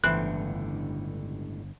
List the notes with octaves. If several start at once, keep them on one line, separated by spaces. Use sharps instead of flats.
G1 C#2 A2 D3 E3 C5 F#6